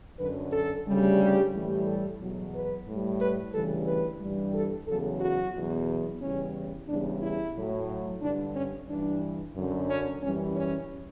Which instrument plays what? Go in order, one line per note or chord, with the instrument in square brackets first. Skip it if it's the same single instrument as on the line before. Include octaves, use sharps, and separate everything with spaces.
[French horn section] F#2 D3 F#3 B4
A4
D2 C#3 G3
G4
A2 E3 G3
A4
E2 B2 F#3
B4
A2 G3
B4
D2 C#3 E3 G3 A4
B4
G2 E3 G3
A4
E2 C#3 F#3 A4
F#4
E2 B2 F#3
E2 C#3 E3 G3 C#4
E2 C#3 G3 D4
E4
A2 F#3
G2 D3 G3 D4
C#4
G2 E3 G3 D4
F#2 D3 F#3
C#4
F#2 E3 G3 C#4
C#4